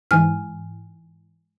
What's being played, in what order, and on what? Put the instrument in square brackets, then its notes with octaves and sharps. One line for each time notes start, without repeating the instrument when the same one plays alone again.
[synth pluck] G#2 E3 [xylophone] G#5 F6